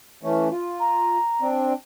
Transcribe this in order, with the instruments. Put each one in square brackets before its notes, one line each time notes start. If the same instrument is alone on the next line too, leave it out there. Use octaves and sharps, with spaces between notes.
[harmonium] E3 A3 C#4
F4
[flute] A#5
[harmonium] C4 D4